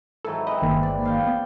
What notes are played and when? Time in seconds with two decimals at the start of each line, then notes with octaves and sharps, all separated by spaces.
0.25 G#2 E3 F#3 A4
0.47 C4 B4 D#5
0.62 G1 D#3 A#3
0.83 D5
1.05 F5 G5
1.27 B3